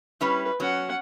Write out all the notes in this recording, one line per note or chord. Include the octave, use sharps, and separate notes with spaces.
G3 C#4 E4 B4
F#3 C#4 F#5